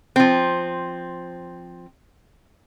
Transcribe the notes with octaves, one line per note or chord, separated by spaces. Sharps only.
F3 C4